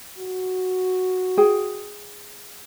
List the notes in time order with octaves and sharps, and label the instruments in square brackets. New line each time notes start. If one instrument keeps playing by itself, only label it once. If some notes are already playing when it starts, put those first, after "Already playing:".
[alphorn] F#4
[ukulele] G#4 G5